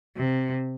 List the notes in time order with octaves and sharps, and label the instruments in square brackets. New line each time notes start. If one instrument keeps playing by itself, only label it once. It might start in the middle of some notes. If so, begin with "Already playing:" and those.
[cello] C3